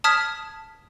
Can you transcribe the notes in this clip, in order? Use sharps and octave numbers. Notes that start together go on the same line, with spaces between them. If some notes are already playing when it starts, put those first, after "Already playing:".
A5 D#6 F6 G#6 B6